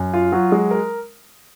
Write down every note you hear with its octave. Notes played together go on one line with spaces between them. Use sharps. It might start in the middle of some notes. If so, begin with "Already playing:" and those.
Already playing: F#2
F4
F#3
G#3
A#4